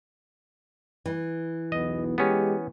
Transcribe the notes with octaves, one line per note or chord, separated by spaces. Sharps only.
E3
B1 E2 B3 D#5
G#3 B3 C#4 G4